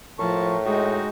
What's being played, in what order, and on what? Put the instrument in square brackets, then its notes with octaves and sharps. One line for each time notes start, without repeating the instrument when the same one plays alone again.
[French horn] A2 [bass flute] F3 [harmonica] A#4 A5 C#6
[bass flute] G#3 [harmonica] D#4 F#4 G5